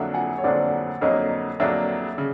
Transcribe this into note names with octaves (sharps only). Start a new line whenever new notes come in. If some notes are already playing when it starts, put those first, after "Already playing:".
Already playing: F2 D3 F#3 A#3 D4 E5 F#5
F#5 G#5
C#5
F2 D3 F#3 A#3 D4 C5 D5
F2 D3 F#3 A#3 D4 C#5 D#5
F2 D3 F#3 A#3 D4 D5 E5
C#3